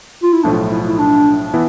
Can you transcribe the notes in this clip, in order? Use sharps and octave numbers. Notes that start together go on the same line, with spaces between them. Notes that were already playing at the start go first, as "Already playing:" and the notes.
F4
E4
B1 A2 F3 A3 D4
E4
E4
D4
E3 B3 E4